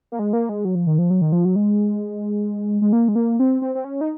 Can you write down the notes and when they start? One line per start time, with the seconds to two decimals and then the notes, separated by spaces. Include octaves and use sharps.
0.12 A#3
0.19 G#3
0.33 A#3
0.49 G#3
0.65 F#3
0.75 F3
0.87 D#3
0.98 F3
1.10 F#3
1.22 D#3
1.32 F3
1.45 F#3
1.56 G#3
2.82 G#3
2.93 A#3
3.08 G#3
3.15 A#3
3.40 C4
3.62 C4
3.75 C4
3.84 C#4
4.01 D#4